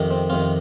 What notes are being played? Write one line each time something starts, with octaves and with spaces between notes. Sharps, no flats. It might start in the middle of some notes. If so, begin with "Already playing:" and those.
Already playing: F2 C3 D#3
C4
F2 C3 D#3 F4